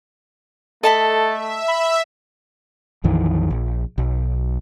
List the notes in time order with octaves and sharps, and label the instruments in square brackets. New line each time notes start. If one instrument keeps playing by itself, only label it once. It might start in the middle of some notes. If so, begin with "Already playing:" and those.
[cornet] A3 [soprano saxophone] A4 [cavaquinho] D#5 A5 B5
[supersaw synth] E5
[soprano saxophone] B5
[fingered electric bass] A#1 F2 D#3 E3
A#1
B1